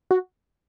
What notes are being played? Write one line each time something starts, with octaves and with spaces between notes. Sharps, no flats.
F#4